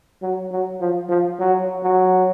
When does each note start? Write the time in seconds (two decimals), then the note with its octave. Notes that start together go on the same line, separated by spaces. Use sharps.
0.22 F#3
0.51 F#3
0.80 F3
1.09 F3
1.39 F#3
1.83 F#3